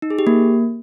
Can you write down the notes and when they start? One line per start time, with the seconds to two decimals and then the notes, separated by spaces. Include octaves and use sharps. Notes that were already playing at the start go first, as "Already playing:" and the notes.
0.02 D#4
0.10 G#4
0.19 G4
0.27 A#3